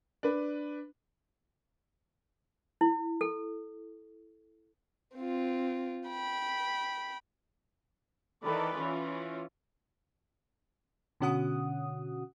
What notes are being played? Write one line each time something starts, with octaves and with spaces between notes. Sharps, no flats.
D4 B4
E4
A4
C4 F4
G5 B5
D#3 E3 A4 B4 D5
E3 C#4 F4
B2 D3 C#4 F#4 F#5 D#6